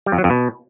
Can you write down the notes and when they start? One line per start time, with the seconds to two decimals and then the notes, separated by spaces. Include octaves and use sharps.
0.06 G3
0.12 F2
0.18 F#3
0.24 F2
0.30 B2